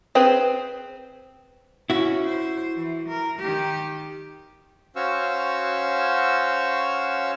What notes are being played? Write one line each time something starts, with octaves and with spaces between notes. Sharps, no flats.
C4 G#4 B4 C5 G5
C#4 E4 F#4
C5
E3
A#4
D#3 G4
C#4 F#4 C5 F5 C#6 E6